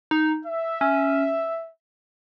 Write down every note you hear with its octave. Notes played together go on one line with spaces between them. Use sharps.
D#4
E5
C#4